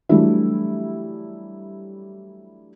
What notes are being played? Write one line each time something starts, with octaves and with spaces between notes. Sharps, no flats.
E3 F#3 G3 A3 D4 E4